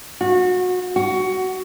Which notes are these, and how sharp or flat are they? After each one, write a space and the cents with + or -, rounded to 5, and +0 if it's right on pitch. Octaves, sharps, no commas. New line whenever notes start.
F#4 -25
F#4 +15